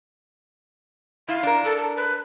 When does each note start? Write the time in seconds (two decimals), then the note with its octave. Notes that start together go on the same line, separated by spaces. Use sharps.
1.28 E4 F5
1.43 D4 A#4
1.65 A4
1.77 A5
1.96 B4